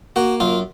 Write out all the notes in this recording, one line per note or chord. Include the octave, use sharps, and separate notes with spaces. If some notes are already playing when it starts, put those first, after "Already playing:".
A#3 F#4
F#2 F4